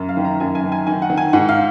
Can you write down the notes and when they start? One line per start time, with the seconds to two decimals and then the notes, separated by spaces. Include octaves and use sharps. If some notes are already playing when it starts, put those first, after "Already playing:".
Already playing: F#2
0.09 F5
0.17 D#3
0.25 A#5
0.40 F#2 G#5
0.55 G#5
0.64 D#3
0.72 G#5
0.87 D#3 G#5
1.02 F#5
1.10 D#3
1.17 G#5
1.33 G#2 F#5
1.49 F5